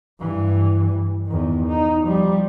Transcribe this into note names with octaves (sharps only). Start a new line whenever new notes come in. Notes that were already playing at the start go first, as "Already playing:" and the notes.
G2 E3
E2 D#3
D#4
F3 G3